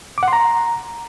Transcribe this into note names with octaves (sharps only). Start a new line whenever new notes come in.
D6
F#5
C6
A#5